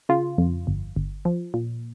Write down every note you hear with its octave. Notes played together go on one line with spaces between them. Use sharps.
C#3 F4
F2
G1
G1
F3
A#2